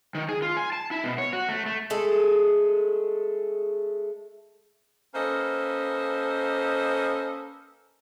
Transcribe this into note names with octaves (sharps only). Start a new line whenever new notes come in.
D#3
G#4
F4
G#5
A5
E4
B2
C#5
F#4
A3
A3
G#3 A3 G#4 A4
A#3 C#4 A4 B4 C5 D#5